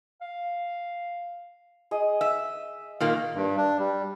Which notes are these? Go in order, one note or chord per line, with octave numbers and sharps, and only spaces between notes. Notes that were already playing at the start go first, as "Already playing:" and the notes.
F5
G#4 D#5
E5
A#2 D#3 A#3
G2
D4
G3